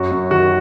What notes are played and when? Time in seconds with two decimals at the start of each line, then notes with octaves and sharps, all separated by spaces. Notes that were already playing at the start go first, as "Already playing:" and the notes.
Already playing: F#2 F#4
0.11 F#2
0.31 D#3 F#4